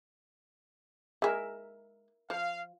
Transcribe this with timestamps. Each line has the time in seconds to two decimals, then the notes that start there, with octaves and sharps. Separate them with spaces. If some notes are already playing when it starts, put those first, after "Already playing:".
1.22 G#3 G#4 A#4 E5
2.30 F3 F5